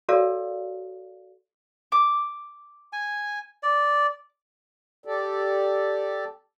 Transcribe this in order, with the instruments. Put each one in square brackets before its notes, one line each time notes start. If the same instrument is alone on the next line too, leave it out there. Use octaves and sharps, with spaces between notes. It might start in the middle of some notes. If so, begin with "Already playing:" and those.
[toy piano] F#4 A4 A#4 C#5 D5 F5
[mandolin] D6
[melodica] G#5
D5
[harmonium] G4 A4 D5